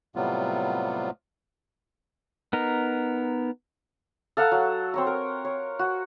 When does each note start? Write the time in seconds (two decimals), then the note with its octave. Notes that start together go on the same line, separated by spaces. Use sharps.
0.16 A2 C3 F#3 G3 B3 F4
2.53 B3 D#4 A#4
4.37 A4 F5 F#5 A#5
4.52 F#3
4.94 C4 C#5 A#5
5.07 A#4
5.45 C#5
5.79 F#4